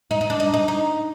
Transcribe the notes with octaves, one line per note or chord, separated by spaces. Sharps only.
D#4
D#4
D4
D#4
D#4
D#4